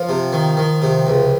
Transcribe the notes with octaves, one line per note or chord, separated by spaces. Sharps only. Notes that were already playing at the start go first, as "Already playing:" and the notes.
Already playing: F3 F4
C3
D#3
D#3
C3
C#2